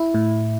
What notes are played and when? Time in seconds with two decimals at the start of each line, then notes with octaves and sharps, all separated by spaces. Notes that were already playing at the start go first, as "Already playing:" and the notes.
Already playing: E4
0.15 A2